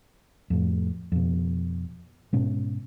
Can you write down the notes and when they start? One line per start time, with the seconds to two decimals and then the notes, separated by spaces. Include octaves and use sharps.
0.50 F2 A2
1.12 F2 B2
2.33 G#2 B2 C#4